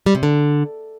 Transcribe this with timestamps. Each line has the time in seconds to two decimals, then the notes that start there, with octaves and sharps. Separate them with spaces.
0.06 G3
0.15 C3
0.23 D3